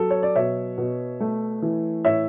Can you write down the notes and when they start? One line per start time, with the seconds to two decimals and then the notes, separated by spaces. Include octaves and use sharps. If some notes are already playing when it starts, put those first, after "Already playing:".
Already playing: F#3 B3 A4
0.10 C#5
0.23 D5
0.36 B2 C#5 E5
0.78 B2
1.20 A3
1.62 E3
2.05 A2 C#5 E5